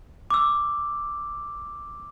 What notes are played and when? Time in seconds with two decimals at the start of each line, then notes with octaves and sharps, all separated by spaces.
0.30 D6 E6